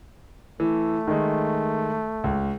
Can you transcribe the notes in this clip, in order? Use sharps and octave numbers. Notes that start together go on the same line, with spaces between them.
E3 A3
D#3 G#3
C#2